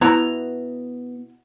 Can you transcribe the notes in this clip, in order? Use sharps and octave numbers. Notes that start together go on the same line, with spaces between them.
B2 B3 E4 A#5